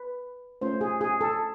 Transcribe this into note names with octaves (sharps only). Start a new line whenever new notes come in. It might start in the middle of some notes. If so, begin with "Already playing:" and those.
Already playing: B4
A3 C#4 F4 C5
G#4
G#4
A4